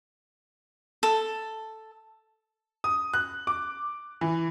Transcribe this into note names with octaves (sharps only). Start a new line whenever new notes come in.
A4
D#6
F#6
D6
E3